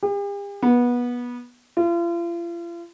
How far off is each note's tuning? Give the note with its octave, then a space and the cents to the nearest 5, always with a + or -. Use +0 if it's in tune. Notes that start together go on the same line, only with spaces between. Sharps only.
G4 +45
B3 -20
F4 -40